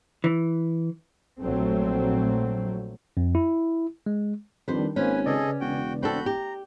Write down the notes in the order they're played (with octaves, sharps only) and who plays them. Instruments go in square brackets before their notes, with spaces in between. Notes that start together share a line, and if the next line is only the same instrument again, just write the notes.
[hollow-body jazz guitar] E3
[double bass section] A#1 F#3 A3 C4
[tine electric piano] F2
E4
G#3
[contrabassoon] F2 [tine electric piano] D#3 G3 D4 [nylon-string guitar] B4 C5
[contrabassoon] G#1 [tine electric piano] A#3 C5 [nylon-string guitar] C#4 [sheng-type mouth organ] B4 G#5
[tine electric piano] C#3 B4 D5 [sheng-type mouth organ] G#4 A4 D#5
[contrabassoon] E1 [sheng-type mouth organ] F#4 G5
[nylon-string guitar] C4 D4 A4 [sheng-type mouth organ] F#4 B5 G6
[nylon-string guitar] G4 [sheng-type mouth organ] A#5